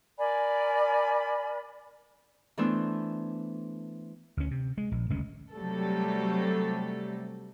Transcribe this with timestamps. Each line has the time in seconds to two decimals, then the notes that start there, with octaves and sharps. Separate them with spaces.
0.18 A#4 D5 G#5 B5
2.58 E3 A3 B3 D4 C5 E5
4.37 D2 C#4
4.51 C3
4.78 G#3
4.92 A#1
5.10 F#1 D2 G#3 C#4
5.55 C3 F#3 G3 A3 A4